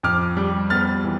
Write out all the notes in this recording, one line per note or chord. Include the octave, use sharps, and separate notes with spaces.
F2 D6 F6
G3
B3 F6 A6
E3